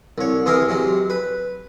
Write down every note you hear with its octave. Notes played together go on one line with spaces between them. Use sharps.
C2 C#5
C3 E3 C4 G#4 A#4
C3 F#3 G#3
B4